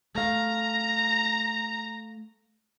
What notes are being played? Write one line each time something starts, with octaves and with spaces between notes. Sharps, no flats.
A3 F5 A#5